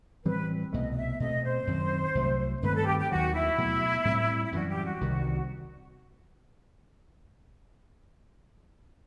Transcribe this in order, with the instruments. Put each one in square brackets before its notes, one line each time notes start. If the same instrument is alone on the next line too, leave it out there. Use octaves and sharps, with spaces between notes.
[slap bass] A2 E3 G3 C4 [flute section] B4
[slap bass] C2 B2 A3 [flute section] D#5
[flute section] D#5
E5
[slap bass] B2 A3 C4 [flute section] D#5
[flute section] C5
[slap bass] F#2 D#3 F#3 C4
C2 C3 F#3 A3
[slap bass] G2 D#3 A3 C4 [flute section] B4
[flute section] A4
G4
G4
[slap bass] D#2 D#3 F#3 [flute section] F#4
[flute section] E4
[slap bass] B2 F#3 A3
A2 G3 C4
[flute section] E4
[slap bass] F#2 E3 G3 [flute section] F#4
[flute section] G4
F#4
[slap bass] C2 C3 D#3 G3